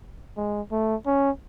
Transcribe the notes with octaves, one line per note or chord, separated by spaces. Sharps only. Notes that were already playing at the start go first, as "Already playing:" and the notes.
G#3
A3
C#4